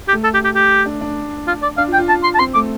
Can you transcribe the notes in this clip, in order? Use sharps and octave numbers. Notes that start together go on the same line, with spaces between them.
G4
A3
A4
G4
G4
G4
D4
D4
F4
D5
D4 F5
F4
G5
F4
A5
C6
A5
C4 C6
A3 D6